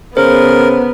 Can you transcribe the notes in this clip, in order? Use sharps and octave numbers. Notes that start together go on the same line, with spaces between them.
C#3 B3 A#4 C5